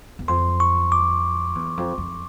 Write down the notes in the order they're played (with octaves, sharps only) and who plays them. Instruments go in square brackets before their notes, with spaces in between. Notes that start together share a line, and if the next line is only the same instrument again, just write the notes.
[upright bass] E2
[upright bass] F2 [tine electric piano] C6
[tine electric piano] C#6
D6
[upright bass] E2
F2
F2